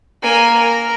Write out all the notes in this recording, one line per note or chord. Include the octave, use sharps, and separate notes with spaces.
A#3 G#5
A#4